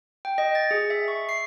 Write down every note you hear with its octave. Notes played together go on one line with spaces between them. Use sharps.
G5
D#5
A6
G#4
E5
C#6
C7